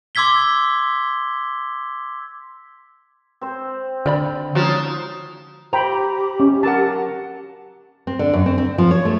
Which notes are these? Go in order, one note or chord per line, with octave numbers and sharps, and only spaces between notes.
C6 D6 E6 G#6 B6 G7
C4 C5
D3 A#4 D5 B5
F3 G#3 C#4 D#4 F#4
G4 C5 G5 A#5 B5
C#4
F#3 A#4 F#5 A5
C4
D3
F#2
C4
C4
F3
C#5
A3